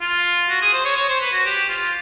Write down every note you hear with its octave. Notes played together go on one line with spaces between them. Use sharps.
F4
F#4
G#4
C5
C#5
C#5
C5
B4
F#4
G4
F4